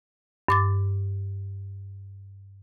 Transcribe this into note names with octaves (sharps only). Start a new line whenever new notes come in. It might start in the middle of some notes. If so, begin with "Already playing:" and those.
G2 D6 A6